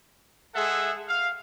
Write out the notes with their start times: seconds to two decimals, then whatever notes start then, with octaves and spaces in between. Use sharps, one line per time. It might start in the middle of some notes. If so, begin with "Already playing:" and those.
0.54 G#3 G#4 A4 E5 F#5
1.07 F5